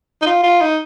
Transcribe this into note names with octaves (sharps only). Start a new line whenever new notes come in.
D#4
F4
F4
D#4